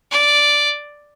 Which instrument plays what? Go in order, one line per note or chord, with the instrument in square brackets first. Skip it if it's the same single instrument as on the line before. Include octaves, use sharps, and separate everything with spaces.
[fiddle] D5